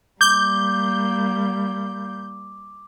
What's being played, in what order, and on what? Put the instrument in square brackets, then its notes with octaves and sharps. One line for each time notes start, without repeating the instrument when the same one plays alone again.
[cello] G3 A#3 [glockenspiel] D6 [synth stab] G6